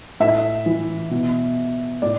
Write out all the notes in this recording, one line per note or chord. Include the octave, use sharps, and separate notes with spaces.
A2 E5
E3
B2
A2 D5